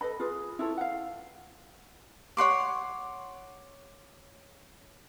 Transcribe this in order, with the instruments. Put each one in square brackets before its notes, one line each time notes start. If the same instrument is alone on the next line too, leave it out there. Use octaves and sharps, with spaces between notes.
[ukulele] A4 B4 D#5 B5
F4 G#4 B4
E4 F4 A4 C#5
F5 F#5
[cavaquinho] C#5 F#5 C6 D6